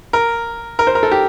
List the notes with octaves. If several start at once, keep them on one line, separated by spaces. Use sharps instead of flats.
A#4
A#4
C5
A#4
A4
G4